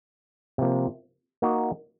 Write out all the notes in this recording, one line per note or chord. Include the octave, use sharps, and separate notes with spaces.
C3 F3 A#3
A#3 D#4 F#4